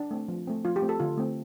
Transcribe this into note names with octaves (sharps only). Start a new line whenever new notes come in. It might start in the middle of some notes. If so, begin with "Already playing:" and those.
Already playing: D4
A3 C4
F3
A3 C4
F3 F4
G4
A3 C4
A4
D3 F4
A3 C4